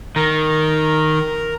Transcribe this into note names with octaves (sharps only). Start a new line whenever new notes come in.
D#3 A#4 A#5